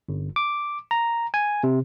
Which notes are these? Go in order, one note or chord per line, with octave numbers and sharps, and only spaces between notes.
G1
D6
A#5
G#5
C3